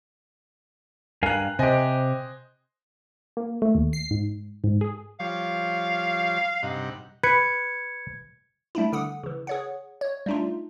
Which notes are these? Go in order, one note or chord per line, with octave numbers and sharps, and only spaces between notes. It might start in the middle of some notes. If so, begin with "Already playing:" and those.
G2 A#4 F5 G#5 F#6
C3 G4 C5 D#5 G#5
A#3
A3
D#2
C7
G#2
G#2
G#4
F3 G3 C#5 F5
G2 C3 D#4 F#5
B4 G#6 C#7
G3 A3 D4 E4
D3 F#5 D#6
C#3 E3
G#4 C#5 F#5
C#5
G3 A3 D4 D#4 F4